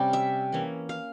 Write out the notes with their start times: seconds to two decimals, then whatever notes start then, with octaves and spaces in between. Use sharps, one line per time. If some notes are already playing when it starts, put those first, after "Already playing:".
Already playing: C3 G3 C#4
0.13 E5
0.52 E3 A#3 C#4
0.89 F5